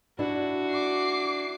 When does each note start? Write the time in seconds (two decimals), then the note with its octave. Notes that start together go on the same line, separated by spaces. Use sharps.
0.19 D4 E4 F#4
0.70 D6 C7